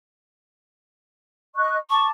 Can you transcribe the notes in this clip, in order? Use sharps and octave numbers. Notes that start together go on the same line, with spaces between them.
D#5 C#6 F#6
A5 C#6 D6